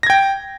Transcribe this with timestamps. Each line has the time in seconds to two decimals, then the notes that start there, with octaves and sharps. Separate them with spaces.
0.03 A#6
0.07 G#6
0.10 G5